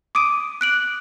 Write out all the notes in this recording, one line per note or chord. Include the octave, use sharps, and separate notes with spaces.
D6 D#6 D7 D#7
F#6 D7 F#7